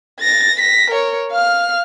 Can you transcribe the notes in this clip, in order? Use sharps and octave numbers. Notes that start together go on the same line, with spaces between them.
A6 A#6
A#6 B6
A#4 C#5
F5 F6